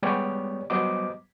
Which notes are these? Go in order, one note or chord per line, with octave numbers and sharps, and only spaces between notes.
G3 G#3 B3 G4 C#5 D5
F#3 G3 B3 C5 D#5 D6